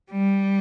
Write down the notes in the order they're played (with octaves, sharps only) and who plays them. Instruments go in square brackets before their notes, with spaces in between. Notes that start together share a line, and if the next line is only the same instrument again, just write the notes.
[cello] G3